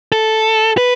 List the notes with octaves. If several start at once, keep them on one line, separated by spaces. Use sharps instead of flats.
A4
B4